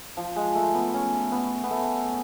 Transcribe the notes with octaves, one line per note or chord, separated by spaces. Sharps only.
F3
G#3
A3
B3
C#4
B3
B3
A3